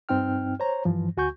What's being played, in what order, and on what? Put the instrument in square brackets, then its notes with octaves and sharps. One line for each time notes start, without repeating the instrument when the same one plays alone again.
[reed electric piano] G2 C4 D#4 G5 F6
C5 C#5 A#5
G2 E3 F3
D2 F#4 G#5 C#6 G6